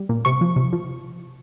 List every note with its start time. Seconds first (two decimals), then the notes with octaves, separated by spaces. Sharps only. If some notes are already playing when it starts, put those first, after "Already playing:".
Already playing: G3
0.09 A#2
0.25 C3 C#6
0.41 F3
0.56 C3
0.73 F3